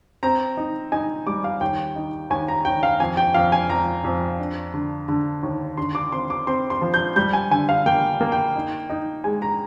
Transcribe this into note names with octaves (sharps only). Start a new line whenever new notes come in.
C4 A#5
D#4
D#4 G#5
G3 D6
F5
D#2 G5
D#4
D#2 G#5
A#5
D#2 G5
F5
F2 G#5
G5
F2 F5
G#5
F2 A#5
F2
D4
D3
D3
D#2
D3 C6
D6
C4 C6
D6
C4 C6
C6
F3
G6
G3 G6
G#5
D3 G#5
F5
A#3 G5
A#3
G5
D#4
D#4
G#3 G#5
A#5